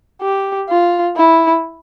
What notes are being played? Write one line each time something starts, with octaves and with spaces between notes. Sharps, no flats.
G4
F4
E4